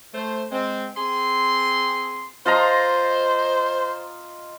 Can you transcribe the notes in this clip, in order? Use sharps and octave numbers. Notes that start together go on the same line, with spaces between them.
A3 C5
G#3 C4
C4 G#4 C6
F4 C5 D#5 A#5